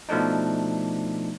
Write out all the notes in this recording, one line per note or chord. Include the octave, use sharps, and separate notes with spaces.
B2 F3 A3 D4 D#4